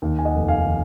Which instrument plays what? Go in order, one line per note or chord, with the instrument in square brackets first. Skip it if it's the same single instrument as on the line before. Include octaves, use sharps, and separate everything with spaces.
[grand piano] D#2
G#5
D#5 F#5
F1
F5 G#5
D#3